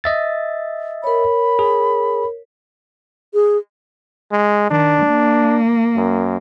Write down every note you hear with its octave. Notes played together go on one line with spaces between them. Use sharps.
D#5 E5 A6
A#4 C#5 B5
G#4
G#4
G#3
D#3 D4
A#3
F#2